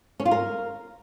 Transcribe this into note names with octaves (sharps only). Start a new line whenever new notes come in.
C#4
F4
A#4